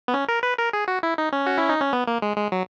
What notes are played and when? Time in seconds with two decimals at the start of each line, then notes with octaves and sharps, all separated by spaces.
0.08 B3
0.14 C#4
0.28 A#4
0.43 B4
0.58 A#4
0.73 G#4
0.88 F#4
1.03 E4
1.18 D#4
1.32 C#4
1.47 F#4
1.58 E4
1.69 D#4
1.81 C#4
1.93 B3
2.07 A#3
2.22 G#3
2.37 G#3
2.52 F#3